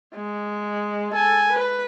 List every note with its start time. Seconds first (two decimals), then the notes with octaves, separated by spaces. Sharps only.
0.14 G#3
1.14 A4 G#5
1.52 B4